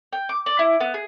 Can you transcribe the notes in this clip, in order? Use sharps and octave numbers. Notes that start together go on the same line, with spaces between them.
G5
D6
D5
E4
B3
G#4